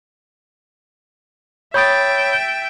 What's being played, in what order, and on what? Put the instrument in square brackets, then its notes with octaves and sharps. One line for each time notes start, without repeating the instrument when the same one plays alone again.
[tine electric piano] C#5 B5 D#6 [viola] E5 G5 [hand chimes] G6 A6